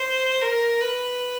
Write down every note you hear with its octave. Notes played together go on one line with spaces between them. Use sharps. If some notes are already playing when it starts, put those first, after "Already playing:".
Already playing: C5
A#4
B4